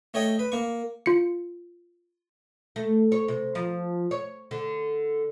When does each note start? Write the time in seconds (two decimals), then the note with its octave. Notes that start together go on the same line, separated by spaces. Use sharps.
0.14 A3 C#5 D#5 G5
0.39 B4
0.52 A#3 C#6
1.06 F4 C#7
2.76 A3
3.12 C#5
3.28 C3
3.55 F3
4.11 C#5
4.51 D3